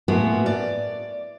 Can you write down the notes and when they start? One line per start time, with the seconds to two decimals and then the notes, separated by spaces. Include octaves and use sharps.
0.08 A2 G#3 A#3 B3 F#4
0.46 D5